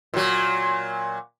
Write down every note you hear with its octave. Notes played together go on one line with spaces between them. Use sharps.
A#2 F#3